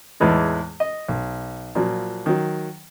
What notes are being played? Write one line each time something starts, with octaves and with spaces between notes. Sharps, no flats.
E2 A2 E3 G#3 D#4
D#5
B1
A#2 F3 F#3
D#3 F#3